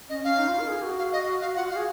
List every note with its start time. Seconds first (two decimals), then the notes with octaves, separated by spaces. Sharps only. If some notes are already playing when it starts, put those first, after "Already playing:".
0.09 C#4 D#5
0.24 C#4 F5
0.38 D#4
0.48 F4
0.59 A#4
0.69 G#4
0.83 F#4
0.98 F5
1.13 D#5
1.41 F5
1.56 F4 F#5
1.65 F#4
1.71 F5
1.76 G#4